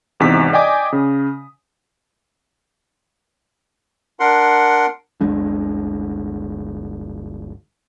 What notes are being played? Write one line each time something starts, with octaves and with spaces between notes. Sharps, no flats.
G#1 E2 C3 D#4 B6
D5 D#5 G5 G#5 D6 D#6
C#3
D4 A#4 F#5 C6
G1 D2 G#3 D4